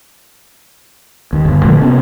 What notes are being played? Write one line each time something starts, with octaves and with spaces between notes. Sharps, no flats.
D#2
G1
A#2 D3 F3 A3
C3 A#3 B3 C#4